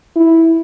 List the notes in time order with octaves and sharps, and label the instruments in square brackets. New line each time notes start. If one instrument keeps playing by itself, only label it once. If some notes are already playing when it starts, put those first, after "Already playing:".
[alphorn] E4